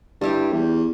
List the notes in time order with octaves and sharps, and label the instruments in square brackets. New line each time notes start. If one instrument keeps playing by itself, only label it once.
[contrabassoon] G2 [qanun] G3 E4 G4
[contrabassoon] E2